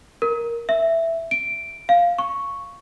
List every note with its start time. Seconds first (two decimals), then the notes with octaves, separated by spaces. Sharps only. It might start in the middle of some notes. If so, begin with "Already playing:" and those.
0.22 A#4
0.69 E5
1.31 D7
1.89 F5
2.19 C#6